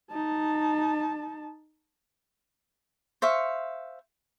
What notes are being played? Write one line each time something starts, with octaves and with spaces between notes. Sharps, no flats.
D#4 A5
C5 E5 F5 C#6